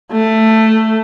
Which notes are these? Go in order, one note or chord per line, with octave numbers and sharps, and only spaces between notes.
A3